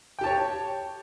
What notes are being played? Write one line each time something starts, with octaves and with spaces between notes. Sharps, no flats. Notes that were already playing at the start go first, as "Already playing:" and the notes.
G4 C#5 G5 A5